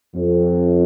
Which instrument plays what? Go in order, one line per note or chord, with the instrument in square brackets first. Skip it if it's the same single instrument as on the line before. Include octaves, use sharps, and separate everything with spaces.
[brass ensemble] F2